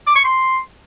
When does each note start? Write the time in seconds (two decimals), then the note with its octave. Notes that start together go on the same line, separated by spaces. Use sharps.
0.07 D6
0.16 C#6
0.24 C6